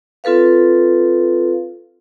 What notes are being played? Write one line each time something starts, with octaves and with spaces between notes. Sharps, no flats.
C4 F4 A4 B4 F5